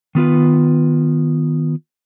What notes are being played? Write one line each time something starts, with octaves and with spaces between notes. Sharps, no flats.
D#3 B3 F4 B4